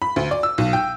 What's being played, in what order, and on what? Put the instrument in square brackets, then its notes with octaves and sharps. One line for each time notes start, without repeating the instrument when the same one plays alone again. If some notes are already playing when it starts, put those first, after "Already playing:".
[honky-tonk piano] B5
D2
D5
E6
B1
G5